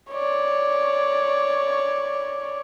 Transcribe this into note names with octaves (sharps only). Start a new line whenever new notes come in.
C#5 D5